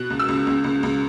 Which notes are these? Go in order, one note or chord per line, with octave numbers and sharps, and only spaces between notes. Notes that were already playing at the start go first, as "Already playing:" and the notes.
Already playing: B2 F#6
C#2
E6
C#2
C#2
C#2
C#2